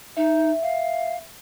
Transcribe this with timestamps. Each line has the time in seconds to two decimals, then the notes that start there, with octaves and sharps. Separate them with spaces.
0.17 D#4 E5
0.62 F5